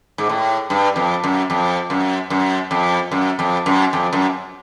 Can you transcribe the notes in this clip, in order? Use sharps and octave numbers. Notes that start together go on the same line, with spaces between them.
G#2
A2
G2
F2
F#2
F2
F#2
F#2
F2
F#2
F2
F#2
F2
F#2